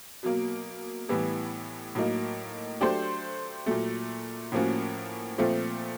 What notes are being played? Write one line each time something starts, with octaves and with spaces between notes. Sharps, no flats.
B2 F#3 A#3
A2 E3 G3 B3
A2 F#3 A#3 D#4
F#3 A3 D4 G4 C5
A#2 F#3 A3
A2 F3 A#3 C#4 F#4
A#2 F3 A3 C4 F4